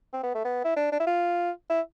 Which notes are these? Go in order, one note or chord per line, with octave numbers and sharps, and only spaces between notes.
C4
B3
A3
B3
E4
D4
D4
E4
F4
E4